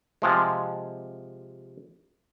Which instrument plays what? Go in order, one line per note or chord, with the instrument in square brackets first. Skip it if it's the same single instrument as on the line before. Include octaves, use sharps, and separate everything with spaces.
[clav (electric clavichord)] C3 F3 G#3